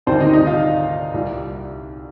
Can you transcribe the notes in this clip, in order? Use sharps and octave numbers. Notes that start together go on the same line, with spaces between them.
D2 C3 D#3 G3 C4 C5
D#4 D#5
D#4 D#5
F4 F5
C2 A#2 G3